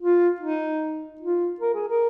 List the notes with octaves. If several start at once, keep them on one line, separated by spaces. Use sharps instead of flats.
F4
D#4
F4
A#4
G#4
A#4